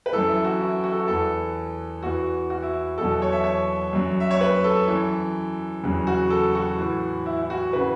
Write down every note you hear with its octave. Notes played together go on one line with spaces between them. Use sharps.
B4
F#2 E3 A4
E4
F#4
E4
F#4
A4
F#4
E2 E3 A4
E2 E3 F#4
F#4
E4
E2 B2 F#3 A4
C#5
E5
C#5
F#2 F#3
E5
C#5
B4
A4
F#2 E3
E2 C#3 F#3
F#4
A4
F#4
A2 E3
E4
E4
F#4
C#3 E3 B4